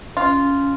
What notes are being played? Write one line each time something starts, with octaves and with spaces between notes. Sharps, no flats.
C#4 F4